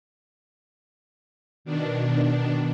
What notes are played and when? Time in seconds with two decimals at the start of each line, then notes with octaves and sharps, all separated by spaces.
1.65 B2 D#3 D4